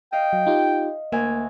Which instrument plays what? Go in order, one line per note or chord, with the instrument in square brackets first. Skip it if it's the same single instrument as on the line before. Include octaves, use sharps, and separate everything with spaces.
[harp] D#5 F5 [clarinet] G5
[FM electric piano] F#3
D#4 F4 G4
[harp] D2 E5 G#5 [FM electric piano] A#3